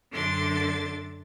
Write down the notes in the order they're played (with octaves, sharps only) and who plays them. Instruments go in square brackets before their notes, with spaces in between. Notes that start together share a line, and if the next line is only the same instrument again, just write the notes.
[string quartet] F#2 D3 D4 A4 C6 A6